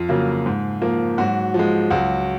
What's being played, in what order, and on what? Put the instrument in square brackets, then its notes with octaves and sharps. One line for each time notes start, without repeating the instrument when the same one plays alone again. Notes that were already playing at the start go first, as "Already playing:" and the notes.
Already playing: [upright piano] F2 F4
C#3 F#3 A#3
G#2
F3 A#3
G#2 F#3 F#4
F3 G#3
C#2 F#3 F#4